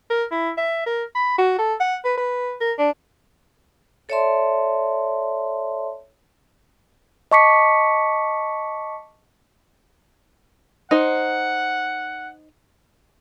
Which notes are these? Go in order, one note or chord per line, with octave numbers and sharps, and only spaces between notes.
A#4
E4
E5
A#4
B5
F#4
A4
F#5
B4
B4
A#4
D4
A4 C#5 D5 E5 A5 C6
D#5 A5 C#6 D6 B6 C#7
D#4 C5 F#5